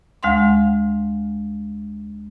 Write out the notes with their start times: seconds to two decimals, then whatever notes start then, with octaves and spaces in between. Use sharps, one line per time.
0.23 D2 G#3 F5 F#5 C6